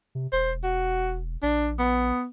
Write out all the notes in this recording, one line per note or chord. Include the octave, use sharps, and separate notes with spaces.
C3
E1 C5
F#4
A#1 D4
B3